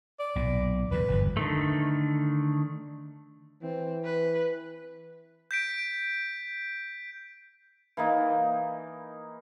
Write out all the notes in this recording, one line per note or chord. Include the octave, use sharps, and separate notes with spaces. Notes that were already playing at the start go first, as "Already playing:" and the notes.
D5
B1 A#2
E2 A#2 C#3 B4
G1 G#2 F3
D3 D#3 A3
E3 C4
B4
G6 B6 D7
E3 A#3 D#4